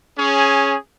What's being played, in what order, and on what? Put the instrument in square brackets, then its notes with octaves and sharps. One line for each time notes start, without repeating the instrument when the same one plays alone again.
[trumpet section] C#4 G#4